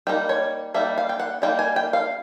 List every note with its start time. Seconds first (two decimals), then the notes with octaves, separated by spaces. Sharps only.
0.07 G3 A#3 D#4 G5
0.29 C#5
0.74 G3 A#3 D#4 E5
0.98 F5
1.09 G5
1.20 F#5
1.42 G3 A#3 D#4 G5
1.59 G#5
1.76 G5
1.93 F5